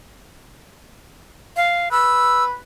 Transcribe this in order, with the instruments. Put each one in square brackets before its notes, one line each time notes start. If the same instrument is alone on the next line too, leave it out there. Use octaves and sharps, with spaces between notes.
[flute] F5
[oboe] B4 [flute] E6